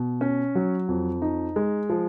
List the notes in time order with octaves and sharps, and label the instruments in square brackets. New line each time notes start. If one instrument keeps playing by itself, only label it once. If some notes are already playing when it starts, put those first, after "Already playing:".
Already playing: [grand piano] B2
C#4
F#3
F2
D#4
G#3
F3